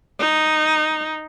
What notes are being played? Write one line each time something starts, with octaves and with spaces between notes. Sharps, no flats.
D#4